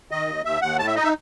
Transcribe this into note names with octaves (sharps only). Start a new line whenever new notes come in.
D#3 D#5
D#2
D#2 E5
D#2 F#5
A2 A5
E5
D#4 D#5
E5